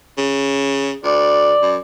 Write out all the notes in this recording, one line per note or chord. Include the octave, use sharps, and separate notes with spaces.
C#3
D2 D5
F#2